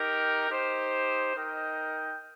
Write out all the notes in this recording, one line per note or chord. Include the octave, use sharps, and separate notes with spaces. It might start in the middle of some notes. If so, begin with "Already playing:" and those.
Already playing: D#4 G4 A#4 G5
D#4 G4 C5
D#4 A#4 D#5 G5